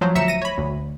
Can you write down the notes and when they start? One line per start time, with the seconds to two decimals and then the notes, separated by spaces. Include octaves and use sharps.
0.01 F3 F#3 C5
0.15 D2 E5 A#5 B6 C#7 E7
0.28 A#6 D#7
0.42 C#5 B5
0.58 D2